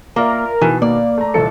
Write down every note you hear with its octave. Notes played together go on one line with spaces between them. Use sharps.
A#3 F4 A#4 D5 E5
B2 D#3 E3
A#3 D5
A3 A#5
D#1 C2 A4 C#7